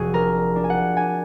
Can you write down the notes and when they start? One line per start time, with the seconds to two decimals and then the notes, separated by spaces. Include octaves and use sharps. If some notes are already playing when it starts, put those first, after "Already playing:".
Already playing: F1 F#4 G#4
0.14 D4 A#4
0.56 D4
0.64 G#5
0.70 F#5
0.96 D4 G#5